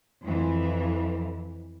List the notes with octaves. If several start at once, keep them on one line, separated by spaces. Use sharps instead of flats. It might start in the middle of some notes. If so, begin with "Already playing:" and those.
F2 E3